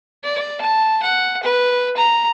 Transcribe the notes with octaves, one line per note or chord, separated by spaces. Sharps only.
D5
A5
F#5
B4
A#5